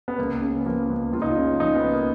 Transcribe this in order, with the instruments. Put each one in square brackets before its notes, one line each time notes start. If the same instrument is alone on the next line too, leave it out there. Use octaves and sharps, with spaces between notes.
[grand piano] B3
C#2 A#3
C#3
B3
F3 A#3
C#2
C#2 F4
D#4
F4
C#3
F3 D#4
B3
C#2
A#3